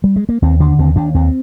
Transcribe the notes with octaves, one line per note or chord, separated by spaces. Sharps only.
G3
G#3
A#3
D#2 C4
D3 D4
D#2 C4
D#2 D4
D#2 C4